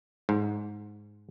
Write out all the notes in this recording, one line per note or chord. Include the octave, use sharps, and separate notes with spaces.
G#2